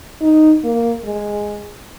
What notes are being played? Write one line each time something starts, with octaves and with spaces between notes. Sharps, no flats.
D#4
A#3
G#3